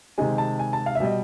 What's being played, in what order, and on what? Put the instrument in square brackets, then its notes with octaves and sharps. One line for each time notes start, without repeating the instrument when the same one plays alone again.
[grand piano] C3 D#3 G#3 G#5
A5
G#5
A5
F5
E5
B2 G3 D#5